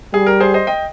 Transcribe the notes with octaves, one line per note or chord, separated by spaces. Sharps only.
G3 G#4
A#4
G#4 C5
C5 D#5
D#5 G5